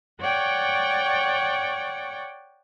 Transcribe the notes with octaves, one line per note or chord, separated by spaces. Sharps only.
C#5 D5 F#5 G5 C#6